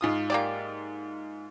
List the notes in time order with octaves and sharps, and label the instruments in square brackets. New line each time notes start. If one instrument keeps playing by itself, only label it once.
[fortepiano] G#2 F4 D#6
[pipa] A#3 G4 D5